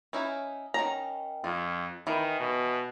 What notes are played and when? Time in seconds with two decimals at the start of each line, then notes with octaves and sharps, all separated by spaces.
0.13 C#4 D#4 E4
0.74 D#3 C#4 A#5
1.44 F2 F4
2.07 D#3 E3
2.40 B2